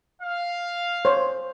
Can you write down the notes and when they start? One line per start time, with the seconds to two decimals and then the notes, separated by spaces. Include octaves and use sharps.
0.21 F5
1.05 C5 C#5